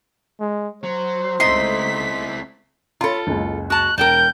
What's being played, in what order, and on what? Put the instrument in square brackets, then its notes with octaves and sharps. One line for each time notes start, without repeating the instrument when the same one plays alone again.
[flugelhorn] G#3
[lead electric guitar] F#3 [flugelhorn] C5
[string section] C#2 A3 B6 [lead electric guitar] C4 E4 [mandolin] D#4 C6
[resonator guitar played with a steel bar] F4 A4 [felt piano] C#5 B5 C6
[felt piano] F#1 C#2
[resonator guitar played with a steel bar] F#4 A5 [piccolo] F#6
[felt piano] E1 [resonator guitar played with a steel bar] A#4 G5 A5 [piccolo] G6